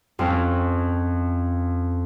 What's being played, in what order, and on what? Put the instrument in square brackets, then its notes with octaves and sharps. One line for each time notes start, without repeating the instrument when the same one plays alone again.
[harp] F2 C4 C#4